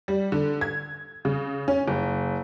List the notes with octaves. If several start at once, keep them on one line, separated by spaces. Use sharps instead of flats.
G3
D3
G#6
C#3
C#4
F#1